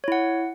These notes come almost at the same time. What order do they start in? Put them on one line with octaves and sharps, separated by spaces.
C#5 E4 F#5